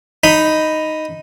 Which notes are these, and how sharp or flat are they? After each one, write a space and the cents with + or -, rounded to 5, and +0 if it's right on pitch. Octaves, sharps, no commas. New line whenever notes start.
D#4 +0 B5 +0